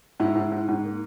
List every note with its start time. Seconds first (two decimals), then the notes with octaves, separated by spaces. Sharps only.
0.20 G#2 E4
0.36 G#2
0.52 G#2
0.68 G#2
0.84 A#3